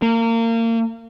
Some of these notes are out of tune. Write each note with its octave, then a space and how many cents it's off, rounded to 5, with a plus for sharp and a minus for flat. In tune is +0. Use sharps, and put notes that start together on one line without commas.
A#3 -30